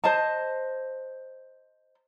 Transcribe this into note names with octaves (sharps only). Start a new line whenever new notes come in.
C5 D#5 A5